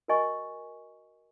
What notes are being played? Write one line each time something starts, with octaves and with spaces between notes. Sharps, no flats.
F#4 A#4 D#5 G#5 C#6